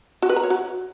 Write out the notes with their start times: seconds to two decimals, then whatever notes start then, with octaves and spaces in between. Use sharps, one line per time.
0.22 F#4
0.29 B4
0.36 A#5
0.43 C#5
0.50 F#4